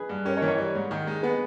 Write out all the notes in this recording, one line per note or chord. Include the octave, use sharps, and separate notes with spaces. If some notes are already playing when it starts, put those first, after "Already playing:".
Already playing: G#4 B4
G2
C#4 G4 A#4
A#4 C#5
E3
A#4 C#5
G3
G#2
D#3
G#3
B3 G#4 B4